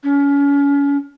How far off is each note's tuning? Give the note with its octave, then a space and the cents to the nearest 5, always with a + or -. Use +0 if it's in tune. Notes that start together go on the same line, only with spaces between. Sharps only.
C#4 +30